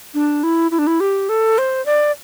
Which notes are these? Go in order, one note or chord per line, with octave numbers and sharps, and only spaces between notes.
D4
E4
E4
D4
E4
G4
A4
C5
D5